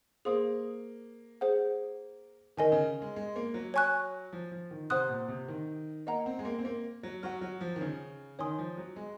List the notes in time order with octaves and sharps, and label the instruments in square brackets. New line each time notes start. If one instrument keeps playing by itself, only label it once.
[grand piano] A#3 [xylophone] G#4 C5 F5 C6 D#6
[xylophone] G#4 C5 F#5
[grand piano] D#3 [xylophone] A#4 D#5 G#5
[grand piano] C#3
G#3
G#3
A#3
F#3
[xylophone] C#5 G#5 C#6 F#6
[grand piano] F3
F3
D#3
[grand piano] C3 [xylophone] C5 F#5 C6 D#6 F#6
[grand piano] A#2
C3
D#3
[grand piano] A#3 [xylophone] D#5 F#5 A#5
[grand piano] C4
G#3
A#3
C4
A#3
F#3
[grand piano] F#3 [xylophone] F#5 C#6 F6
[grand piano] F#3
F3
D#3
C#3
[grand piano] D#3 [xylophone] C#5 G#5 C6 D#6
[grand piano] F3
F#3
G#3